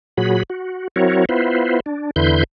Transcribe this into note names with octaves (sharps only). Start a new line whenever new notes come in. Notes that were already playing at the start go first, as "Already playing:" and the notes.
A#2 F#3 F#4 G#4 B5
F#4
F#3 C4 E4 F#4 A#4 C#5
B3 E4 F4 B4 C5
D4
E2 D3 E4 B4 C6 G6